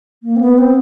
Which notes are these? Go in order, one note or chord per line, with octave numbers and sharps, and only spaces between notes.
A#3
C4
B3
C4